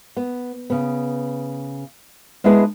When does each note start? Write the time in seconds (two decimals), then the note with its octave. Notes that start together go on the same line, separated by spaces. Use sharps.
0.16 B3
0.70 C#3 B3
2.44 G#3 B3 D4 E4 G#4 B4